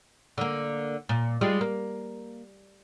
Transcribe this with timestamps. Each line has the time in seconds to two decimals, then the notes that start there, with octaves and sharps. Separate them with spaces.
0.38 D3 A#3
1.09 A#2
1.41 G3 G#3 F4
1.61 A#3